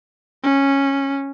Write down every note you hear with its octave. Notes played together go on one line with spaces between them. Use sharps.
C#4